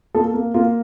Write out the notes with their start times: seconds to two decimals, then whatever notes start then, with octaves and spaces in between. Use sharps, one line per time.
0.15 A#3 F4 A4
0.34 A#3
0.54 A#3 F4